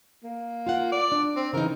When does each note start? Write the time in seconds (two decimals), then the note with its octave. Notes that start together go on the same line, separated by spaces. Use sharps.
0.23 A#3
0.67 F4 F5 F#5
0.92 D5
1.12 D4
1.36 C4
1.53 C#3 E3 D#4 A#4